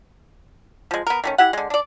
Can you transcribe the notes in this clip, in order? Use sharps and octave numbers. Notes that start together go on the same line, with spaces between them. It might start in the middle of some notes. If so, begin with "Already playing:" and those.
F3 G#3
B3 A#4
D#3 A3 C#4
E4 G4 F#5
D3 G#3
D4 D5